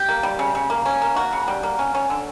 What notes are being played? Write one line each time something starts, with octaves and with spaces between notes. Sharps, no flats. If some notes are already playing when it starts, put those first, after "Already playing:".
Already playing: G4
A#3
G3
C#3
C#3
A#3
C#4
A#3
A#3 F#4
C#3
G3
A#3
C#4
C#4
D3